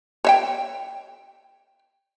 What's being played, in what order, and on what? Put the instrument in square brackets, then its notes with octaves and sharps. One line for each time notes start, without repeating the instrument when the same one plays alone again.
[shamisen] C#5 E5 G5